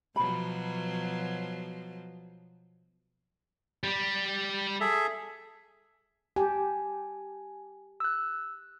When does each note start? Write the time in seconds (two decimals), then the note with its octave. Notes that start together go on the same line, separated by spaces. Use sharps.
0.16 B2 F3 F#3 B5
3.84 G3
4.81 G#4 A4 E5
6.36 G4 G#5 A5
8.00 E6 F#6